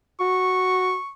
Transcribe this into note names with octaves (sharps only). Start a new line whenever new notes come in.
F#4 C#6